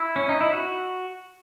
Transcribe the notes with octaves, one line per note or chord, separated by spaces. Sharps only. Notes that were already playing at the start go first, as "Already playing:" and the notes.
Already playing: E4
C#4
D#4
E4
F#4